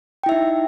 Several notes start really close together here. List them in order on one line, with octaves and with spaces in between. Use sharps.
G5 E4 E5 D#4